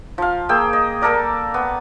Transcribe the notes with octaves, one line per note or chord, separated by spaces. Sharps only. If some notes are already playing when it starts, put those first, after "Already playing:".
F3 F5
A#3 G#4 G5 E6
D#5
A#3 A4 A#4 D5
B3